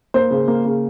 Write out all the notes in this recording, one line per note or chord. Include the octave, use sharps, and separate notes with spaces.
A#3 C5
C#3
A#3
C#3